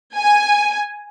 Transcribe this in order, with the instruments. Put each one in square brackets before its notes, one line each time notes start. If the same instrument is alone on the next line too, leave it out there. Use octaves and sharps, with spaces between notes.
[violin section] G#5